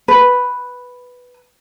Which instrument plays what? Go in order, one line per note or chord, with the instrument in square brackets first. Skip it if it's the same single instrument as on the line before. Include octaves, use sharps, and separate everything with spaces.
[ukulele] B4